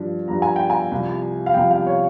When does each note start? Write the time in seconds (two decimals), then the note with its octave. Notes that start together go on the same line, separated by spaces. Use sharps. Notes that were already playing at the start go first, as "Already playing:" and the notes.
Already playing: G2 F3
0.28 G2 F3 A#5
0.42 G#5
0.56 G5
0.70 G#5
0.91 C2 C3 F3
1.46 F5
1.54 C2 C3 F3 G5
1.71 F5
1.87 C#5